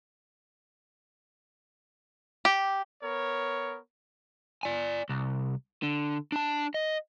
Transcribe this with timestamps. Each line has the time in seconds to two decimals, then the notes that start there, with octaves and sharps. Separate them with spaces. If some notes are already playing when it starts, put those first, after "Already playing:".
2.45 G4
3.02 B3 A#4 C#5
4.63 D5 G#5
5.09 C2
5.83 D3
6.32 D4 A5
6.74 D#5